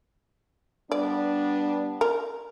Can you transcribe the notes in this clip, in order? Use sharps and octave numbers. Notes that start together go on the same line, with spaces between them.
G3 B3 D4 D5
A#4